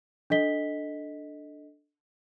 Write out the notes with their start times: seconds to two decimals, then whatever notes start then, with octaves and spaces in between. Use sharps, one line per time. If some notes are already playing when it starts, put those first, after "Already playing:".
0.30 D4 A4 D#5 B6 G7